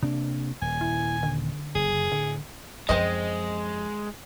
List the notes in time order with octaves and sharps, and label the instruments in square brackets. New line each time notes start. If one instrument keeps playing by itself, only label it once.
[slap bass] C3 A#3 [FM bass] D4
[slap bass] D#1 [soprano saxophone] G#5
[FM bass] E4
D3
[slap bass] F#1 [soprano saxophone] G#4
[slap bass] A2 [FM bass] D3
[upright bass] F#2 F3 [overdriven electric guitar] G#3 [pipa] C4 C5 D#5